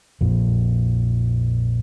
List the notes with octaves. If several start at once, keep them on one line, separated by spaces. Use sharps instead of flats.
A#1 F2